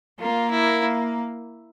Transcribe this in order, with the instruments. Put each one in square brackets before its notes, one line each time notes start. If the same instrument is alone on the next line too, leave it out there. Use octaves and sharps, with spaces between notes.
[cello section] A#3 [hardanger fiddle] F4
[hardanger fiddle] E4